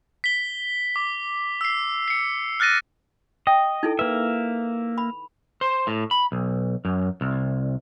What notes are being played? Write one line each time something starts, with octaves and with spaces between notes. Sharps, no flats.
B6 G7
D6
E6 C7
C7 C#7
F6 F#6 A6 A#6 D#7
D#5 G5
D#4 E4 A4
A#3 B4 E5
B5
C5
A2
B5
B1
F#2
C2